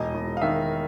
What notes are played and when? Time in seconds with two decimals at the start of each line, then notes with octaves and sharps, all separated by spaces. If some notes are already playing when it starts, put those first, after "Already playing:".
Already playing: E1 D#5
0.15 E1
0.37 F5
0.41 D#3 E5